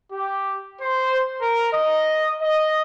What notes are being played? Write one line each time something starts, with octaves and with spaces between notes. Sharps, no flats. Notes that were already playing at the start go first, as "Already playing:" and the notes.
G4
C5
A#4
D#5
D#5